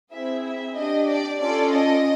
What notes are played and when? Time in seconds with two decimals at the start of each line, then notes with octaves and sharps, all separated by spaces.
0.12 C4 E4 G#4 E5
0.44 E5
0.75 D4 G4 D#5
1.08 D5
1.40 C#4 F4 A4 D5
1.72 D#5